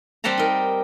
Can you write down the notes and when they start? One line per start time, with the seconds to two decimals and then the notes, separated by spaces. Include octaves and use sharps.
0.24 G3 C4 G4 F#5 A5 A#5
0.38 D#4 A#4